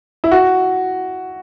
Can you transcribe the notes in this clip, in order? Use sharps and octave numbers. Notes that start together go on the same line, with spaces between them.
E4
F#4